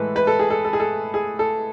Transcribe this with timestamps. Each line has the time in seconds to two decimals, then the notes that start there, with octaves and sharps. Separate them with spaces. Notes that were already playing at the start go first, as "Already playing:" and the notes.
Already playing: A2 E3 G#3 A4 B4
0.16 B4
0.27 A4
0.39 G#4
0.50 A4
0.65 A4
0.73 G#4
0.80 A4
1.14 G#4
1.39 A4